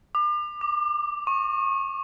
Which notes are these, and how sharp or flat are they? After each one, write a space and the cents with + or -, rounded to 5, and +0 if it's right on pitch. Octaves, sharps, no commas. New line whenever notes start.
D6 +40
D6 +5
C#6 -25